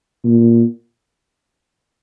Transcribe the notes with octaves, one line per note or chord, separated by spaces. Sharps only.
A#2